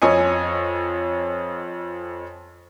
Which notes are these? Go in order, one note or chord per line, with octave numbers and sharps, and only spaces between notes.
F2 C#5 D#5 G#5 C#7